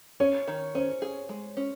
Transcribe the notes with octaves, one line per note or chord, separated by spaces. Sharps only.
C#4 C#5
D#3
C#4 C5
G#4
G#3
C#4